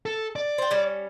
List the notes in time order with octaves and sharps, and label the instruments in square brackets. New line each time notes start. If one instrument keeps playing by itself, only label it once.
[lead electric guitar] A4
D5
[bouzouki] C5 G5
G3 C#4